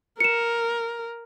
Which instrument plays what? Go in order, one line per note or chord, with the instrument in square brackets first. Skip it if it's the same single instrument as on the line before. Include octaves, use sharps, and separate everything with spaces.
[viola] A#4 [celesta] C#7 E7